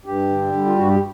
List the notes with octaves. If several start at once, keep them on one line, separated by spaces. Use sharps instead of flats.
G2 G4
D3
G3
F4
G2 F#4
G4